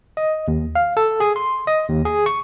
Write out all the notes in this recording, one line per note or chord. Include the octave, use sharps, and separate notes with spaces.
D#5
D#2
F5
A4
G#4
C6
D#5
D#2
G#4
C#6